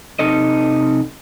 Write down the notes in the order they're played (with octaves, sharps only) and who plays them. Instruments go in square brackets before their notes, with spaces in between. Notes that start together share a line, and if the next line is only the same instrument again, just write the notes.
[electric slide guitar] C3 D#4 A4 D#5